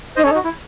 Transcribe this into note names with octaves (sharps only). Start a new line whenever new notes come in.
D#4 C5 D#5
C#4 A4 C#5
D#4
F#4
E4